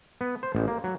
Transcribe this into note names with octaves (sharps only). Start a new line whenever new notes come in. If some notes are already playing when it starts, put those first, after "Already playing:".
B3
C5
A1
A#3
F#3